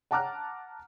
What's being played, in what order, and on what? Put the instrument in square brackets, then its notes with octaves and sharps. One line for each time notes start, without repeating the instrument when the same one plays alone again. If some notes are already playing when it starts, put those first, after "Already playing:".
[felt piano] F#5 A5 A#5 D6 F6 F#6